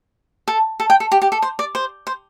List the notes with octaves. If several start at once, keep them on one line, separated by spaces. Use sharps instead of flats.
A4
A4
G5
A4
G4
G4
A4
C5
D5
C5
C5